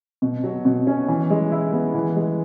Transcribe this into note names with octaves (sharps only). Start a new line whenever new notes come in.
B2
F#3
B2
C#4
E3
G#3
E4
B3
E3
G#3